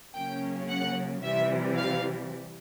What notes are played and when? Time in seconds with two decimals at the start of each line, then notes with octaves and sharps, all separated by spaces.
0.14 C#3 F#3 A#3 C#4 G5
0.69 F#5
1.23 C3 E3 G3 E5
1.77 F5